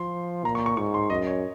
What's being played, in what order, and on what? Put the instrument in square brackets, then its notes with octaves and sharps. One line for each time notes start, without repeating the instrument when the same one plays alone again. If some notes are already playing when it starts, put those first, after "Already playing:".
Already playing: [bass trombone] F3 [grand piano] C6
[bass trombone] A#2 [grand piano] A#5
[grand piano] C#6
C#6
[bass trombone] G#2 [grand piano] C#6
[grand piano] C6
[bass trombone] F#2 [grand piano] D#5
[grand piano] C#5